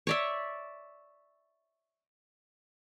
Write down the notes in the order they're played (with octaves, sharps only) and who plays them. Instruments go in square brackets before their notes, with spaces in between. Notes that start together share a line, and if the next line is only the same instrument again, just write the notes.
[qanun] C#5 D5 E5